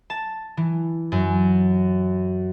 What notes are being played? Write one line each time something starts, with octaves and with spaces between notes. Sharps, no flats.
A5
E3
F#2